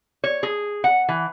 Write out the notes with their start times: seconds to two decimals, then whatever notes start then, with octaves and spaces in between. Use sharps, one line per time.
0.24 C#5
0.43 G#4
0.84 F#5
1.09 E3